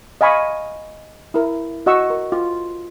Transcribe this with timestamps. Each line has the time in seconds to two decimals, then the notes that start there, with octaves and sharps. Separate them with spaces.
0.21 D#5 F5 G#5 B5 C#6 D#6
1.34 E4 A#4
1.86 F#4 D#5 F#5 C#6 E6
2.10 A#4
2.32 F4